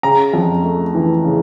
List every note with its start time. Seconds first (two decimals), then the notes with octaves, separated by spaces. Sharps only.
0.03 C#3 A#5
0.34 F2
0.64 A3
0.95 E3
1.24 C#3